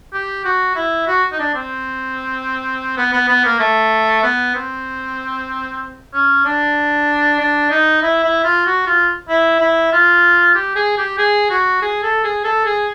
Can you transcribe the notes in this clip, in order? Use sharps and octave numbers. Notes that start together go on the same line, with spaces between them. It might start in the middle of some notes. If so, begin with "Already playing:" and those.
G4
F#4
E4
F#4
D#4
D4
C4
B3
B3
B3
A#3
A3
B3
C4
C#4
D4
D4
D#4
E4
E4
F4
F#4
F4
E4
E4
F4
G4
G#4
G4
G#4
F#4
G#4
A4
G#4
A4
G#4